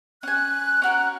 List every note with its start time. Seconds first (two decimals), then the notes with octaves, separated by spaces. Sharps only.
0.23 C#4 G#5 F#6
0.82 C#4 F#4 A#4